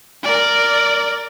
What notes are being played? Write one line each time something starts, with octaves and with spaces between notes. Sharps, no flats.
A#4 D5